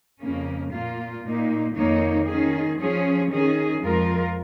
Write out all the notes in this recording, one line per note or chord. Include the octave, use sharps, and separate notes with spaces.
F2 C#3 A#3 C#4
A#2 A#3 F4
A#2 A#3 D#4
F2 D#3 A#3 D#4 C#5
D#3 C#4 G#4
F3 C#4 G#4 C#5
D#3 C#4 G#4
F2 F3 G#3 F4 A#4